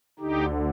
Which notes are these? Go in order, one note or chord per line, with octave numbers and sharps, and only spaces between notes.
D2 D3 D#4 G4